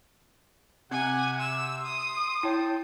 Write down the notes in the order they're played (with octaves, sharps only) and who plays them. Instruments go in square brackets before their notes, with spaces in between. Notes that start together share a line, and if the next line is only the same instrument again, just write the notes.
[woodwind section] C3 [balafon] C4 [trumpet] F#5 [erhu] G#5
[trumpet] C6 [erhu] E6
[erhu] D#6
[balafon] E4 C#5 [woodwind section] G5 A5